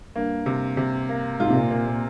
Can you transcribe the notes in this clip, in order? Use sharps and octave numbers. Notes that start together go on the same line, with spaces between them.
G2 A#3
C3
C3
A#3
G#2 F4
C3
A#2
A#2 A#3
A#2